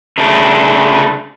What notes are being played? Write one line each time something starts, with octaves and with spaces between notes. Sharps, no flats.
C#3 A3 D4